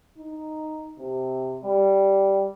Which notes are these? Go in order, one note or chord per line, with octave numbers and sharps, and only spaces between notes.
D#4
C3
G3